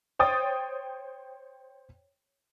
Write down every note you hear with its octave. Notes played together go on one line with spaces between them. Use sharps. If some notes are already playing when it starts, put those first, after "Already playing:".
C5 C#5 G5 D#6 A6